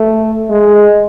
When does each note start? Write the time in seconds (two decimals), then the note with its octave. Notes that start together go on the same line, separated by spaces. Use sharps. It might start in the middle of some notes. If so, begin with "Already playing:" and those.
Already playing: A3
0.50 G#3